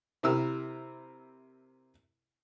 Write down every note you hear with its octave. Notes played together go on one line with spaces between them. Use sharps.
C3 E4 A#4 E6